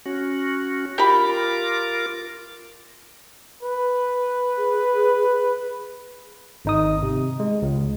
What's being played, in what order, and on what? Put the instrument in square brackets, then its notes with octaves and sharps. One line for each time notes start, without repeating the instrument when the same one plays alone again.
[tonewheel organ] C#4 F#4
[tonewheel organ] F4 A#4 D6 [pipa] G4 B5
[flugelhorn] B4
[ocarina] G#4
[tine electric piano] G#1 D#4 D#6
C3
G#3
C#2